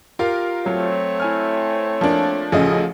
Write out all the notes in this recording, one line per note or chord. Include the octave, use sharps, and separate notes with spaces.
F4 G4 A#4 F5
F#3 A3 C4 C#5
E4 G#5 F6
F3 A#3 D4
A1 C#3 F3 G#4 A4 D#5